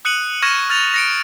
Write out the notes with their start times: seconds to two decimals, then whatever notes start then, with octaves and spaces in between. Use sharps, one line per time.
0.05 D#6 F#6 C#7 D#7 F#7
0.42 C#6 F6 G#6 A#6 E7
0.70 F6 A6 F7
0.94 A#6 C#7 D7